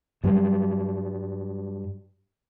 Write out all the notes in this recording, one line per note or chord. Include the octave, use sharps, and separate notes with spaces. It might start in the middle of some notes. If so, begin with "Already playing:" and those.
G2 F#3 G3